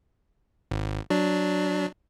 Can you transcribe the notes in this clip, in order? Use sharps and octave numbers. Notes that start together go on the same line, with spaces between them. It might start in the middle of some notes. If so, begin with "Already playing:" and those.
G#1
F#3 D4